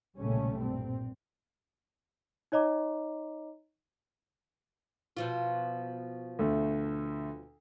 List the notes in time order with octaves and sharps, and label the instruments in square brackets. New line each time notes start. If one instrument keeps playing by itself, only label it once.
[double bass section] B1 A#2 C#3 G3 A3 C#4
G2 A#2 C4
[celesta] D#4 C#5 D#5 A#5 D6
[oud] B2 F3 F4
[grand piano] D2 A3